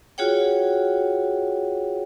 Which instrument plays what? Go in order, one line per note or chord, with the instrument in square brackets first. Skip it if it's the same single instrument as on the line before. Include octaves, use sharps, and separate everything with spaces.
[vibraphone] F4 F#4 G#4 C#5 F#5 G5